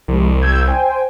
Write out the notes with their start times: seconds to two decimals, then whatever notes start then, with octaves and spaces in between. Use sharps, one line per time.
0.08 C2 F3 G#3
0.42 E6 G6 G#6
0.68 C5 G5 G#5